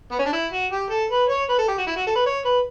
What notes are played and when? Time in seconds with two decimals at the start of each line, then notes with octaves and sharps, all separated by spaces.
0.11 B3
0.19 C#4
0.26 D4
0.33 E4
0.52 F#4
0.71 G4
0.91 A4
1.10 B4
1.29 C#5
1.49 B4
1.58 A4
1.68 G4
1.78 F#4
1.87 E4
1.96 F#4
2.07 A4
2.15 B4
2.26 C#5
2.45 B4